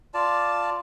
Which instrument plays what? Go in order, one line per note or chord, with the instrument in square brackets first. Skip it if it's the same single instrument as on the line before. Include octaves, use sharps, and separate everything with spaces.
[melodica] F4 D5 A5